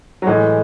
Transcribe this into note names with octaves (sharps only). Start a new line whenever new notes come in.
F#3
A2 E3 G#3